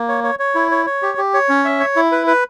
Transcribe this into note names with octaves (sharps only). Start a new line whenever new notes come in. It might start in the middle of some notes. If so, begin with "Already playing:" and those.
Already playing: A#3
C#5
C#5
C#5
E4
C#5
C#5
G4
G4
C#5
C#4
E5
C#5
E4
B4
B4